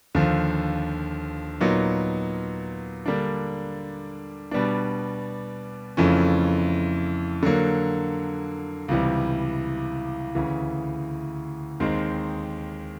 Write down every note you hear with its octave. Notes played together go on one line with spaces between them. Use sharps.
D#2 D3 F3
A#2 F#3 B3 D#4
D3 G3 A#3 D4
B2 G3 B3 D4
F2 C#3 E3 A3 C#4
D3 F#3 A#3
C#2 C3 E3 G3
D2 C#3 E3
D#2 D#3 G#3 C4 D#4